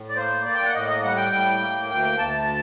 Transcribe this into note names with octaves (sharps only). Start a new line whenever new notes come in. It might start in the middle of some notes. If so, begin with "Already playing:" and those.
Already playing: A2
D5
A#3 C5
A#3 D5
G5
F#5
A2 D#5
D#5
G3 F#5
G5
A2
A#3
D2 G5
D2 A5